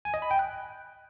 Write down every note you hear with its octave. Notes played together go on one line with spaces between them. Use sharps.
G#5
D#5
B5
G5
F#6